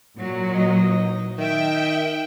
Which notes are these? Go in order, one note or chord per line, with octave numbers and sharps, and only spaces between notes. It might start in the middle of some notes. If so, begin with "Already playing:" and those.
A#2 F#3
E3 D#4 D#5
D#3 E5 G5